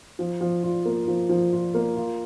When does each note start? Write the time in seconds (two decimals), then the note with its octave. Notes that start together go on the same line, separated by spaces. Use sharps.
0.19 F3
0.41 F3
0.63 F4
0.85 A#3
1.08 F3
1.29 F3
1.52 F4
1.74 A#3
1.96 F4